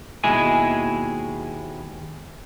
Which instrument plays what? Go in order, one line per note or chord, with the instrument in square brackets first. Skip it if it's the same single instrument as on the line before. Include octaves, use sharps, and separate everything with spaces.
[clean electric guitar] D#2 B2 G#3 E4 G#4 G#5